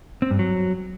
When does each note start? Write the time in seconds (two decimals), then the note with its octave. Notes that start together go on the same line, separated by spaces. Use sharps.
0.22 C4
0.31 G2
0.39 F#3